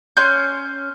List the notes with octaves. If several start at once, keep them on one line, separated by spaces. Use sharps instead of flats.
C#4 C6 F#6 G6